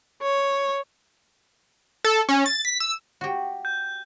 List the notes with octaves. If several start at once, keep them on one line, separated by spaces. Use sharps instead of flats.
C#5
A4
C#4
A6
B6
E6
F#4 G4
G6